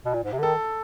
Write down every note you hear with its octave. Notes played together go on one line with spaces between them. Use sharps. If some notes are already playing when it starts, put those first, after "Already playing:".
B2
A#2
G#2
C3
D3
D#3 A4